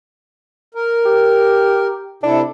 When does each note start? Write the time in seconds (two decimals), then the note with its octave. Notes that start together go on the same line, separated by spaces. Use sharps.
0.75 A#4
1.06 G4
2.23 C3 D4 E4 A4